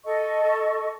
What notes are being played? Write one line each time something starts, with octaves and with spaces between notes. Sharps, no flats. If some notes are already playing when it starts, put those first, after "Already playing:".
A4 D#5 C#6